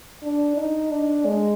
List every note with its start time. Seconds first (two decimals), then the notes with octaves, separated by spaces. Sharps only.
0.23 D4
0.57 D#4
0.92 D4
1.25 G#3